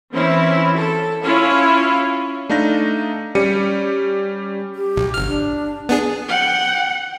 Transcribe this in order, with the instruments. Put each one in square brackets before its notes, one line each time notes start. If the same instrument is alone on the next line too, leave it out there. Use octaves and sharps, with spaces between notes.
[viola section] E3 C4 C#4 E4
A4
C#4 E4 F4 F5
[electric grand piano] A3 D4 D#4 F5 A#6
G3 C#4 G4 C#7 D#7
[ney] G4
[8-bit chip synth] B1
G1 F6
[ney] D4
[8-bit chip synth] B3 D4 G#4
[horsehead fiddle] F#5 G5